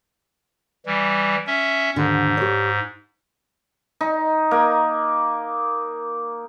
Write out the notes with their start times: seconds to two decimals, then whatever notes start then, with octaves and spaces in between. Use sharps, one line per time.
0.86 E3 G3
1.47 C#4 E5
1.96 D#2 G#2 D3
2.37 G4 C#5
4.01 D#4
4.51 A#3